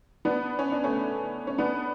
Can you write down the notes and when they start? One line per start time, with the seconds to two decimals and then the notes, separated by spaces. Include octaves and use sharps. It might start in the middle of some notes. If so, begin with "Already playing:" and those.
0.25 B3 D4
0.59 C#4
0.72 D4
0.84 A3 C#4
1.47 C#4
1.58 B3 D4